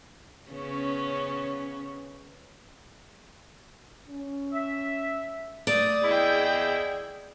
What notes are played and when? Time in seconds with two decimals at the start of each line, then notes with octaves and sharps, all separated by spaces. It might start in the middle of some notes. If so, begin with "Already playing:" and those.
0.51 C#3 B3 C#4
4.08 C#4
4.52 E5
5.67 A3 D5 D#6
6.04 E2 E4 G#4 D#5 G5